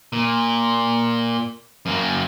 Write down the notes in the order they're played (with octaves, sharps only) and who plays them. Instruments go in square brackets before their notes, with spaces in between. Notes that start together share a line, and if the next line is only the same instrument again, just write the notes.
[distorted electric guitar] A#2
F#2 A#3